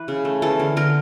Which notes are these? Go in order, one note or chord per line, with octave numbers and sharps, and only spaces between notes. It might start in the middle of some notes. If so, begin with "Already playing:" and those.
Already playing: E3 B4
C#3
A3
E3 A4
D3 A#4
D3 A#4